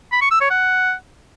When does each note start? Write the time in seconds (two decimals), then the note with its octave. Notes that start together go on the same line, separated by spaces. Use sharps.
0.12 B5
0.22 C#6
0.31 E6
0.41 C#5
0.50 F#5